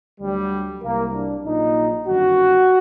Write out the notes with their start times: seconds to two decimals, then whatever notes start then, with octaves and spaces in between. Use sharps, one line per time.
0.20 D2 D3 F#3 G3
0.82 C2 C3 F#3 A#3
1.13 D4
1.45 A#1 A#2 F#3 D#4
2.07 G1 F#2 D#3 F#3 F#4